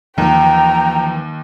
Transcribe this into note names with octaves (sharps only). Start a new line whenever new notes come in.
D#2 E3 F3 G5 A#5